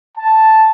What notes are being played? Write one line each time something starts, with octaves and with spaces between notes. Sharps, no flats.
A5